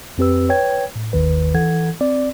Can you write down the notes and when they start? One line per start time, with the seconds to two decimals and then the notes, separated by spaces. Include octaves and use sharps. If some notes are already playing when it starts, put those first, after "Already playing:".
0.18 F2 C4 G4 B4 E6
0.49 B4 C#5 G5 G#6
0.96 A2
1.13 G1 D#2 D#3 B4
1.54 E3 A4 F#5 G#6
2.01 C4 D5